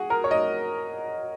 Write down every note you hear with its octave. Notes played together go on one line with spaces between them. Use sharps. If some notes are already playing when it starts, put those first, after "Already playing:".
Already playing: F#4 G#4
A#4
C#5
D#5